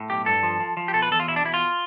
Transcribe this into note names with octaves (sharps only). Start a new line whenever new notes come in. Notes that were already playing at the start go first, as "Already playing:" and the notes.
Already playing: A2
B1 G4
G2 A4
F3
F3
F3
G4
B2 A4
B4
E2 A4
F4
B2 E4
D4
E2 E4
F4